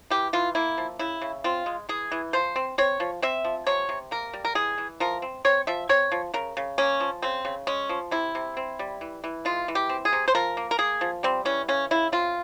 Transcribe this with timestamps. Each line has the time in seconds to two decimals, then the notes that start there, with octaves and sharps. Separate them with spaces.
0.10 E3 G4
0.33 E3 F4
0.55 A#3 E4
0.78 F3
0.99 C#3 E4
1.21 C#3
1.44 C4 F4
1.66 G#3
1.89 E3 G#4
2.12 E3
2.33 F3 C5
2.56 C4
2.78 C4 C#5
3.00 F3
3.22 C4 E5
3.45 F3
3.67 C3 C#5
3.89 C3
4.11 A#3 A#4
4.33 G3
4.45 A#4
4.55 E3 G#4
4.78 E3
5.00 F3 A#4
5.22 C4
5.45 C4 C#5
5.67 F3 E5
5.89 C4 C#5
6.12 F3
6.34 C#3 A#4
6.57 C#3
6.78 A#3 C#4
7.00 F3
7.22 C#3 C4
7.45 C#3
7.67 G#3 C#4
7.89 F3
8.11 C3 E4
8.35 C3
8.57 C4
8.79 G3
9.01 E3
9.24 E3
9.45 G#3 F4
9.68 E3
9.75 G4
9.89 C4
10.05 G#4
10.13 C3
10.28 C5
10.35 F3 A#4
10.57 A#3
10.71 A#4
10.78 A#3 G#4
11.01 F3
11.23 G3 C4
11.45 E3 C#4
11.68 C#3 C#4
11.91 C#3 E4
12.12 C4 F4